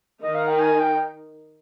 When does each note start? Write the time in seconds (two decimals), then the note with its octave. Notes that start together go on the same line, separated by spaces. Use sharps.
0.22 D#3 D#4 D#5
0.35 F5
0.48 G5
0.60 G#5
0.79 G5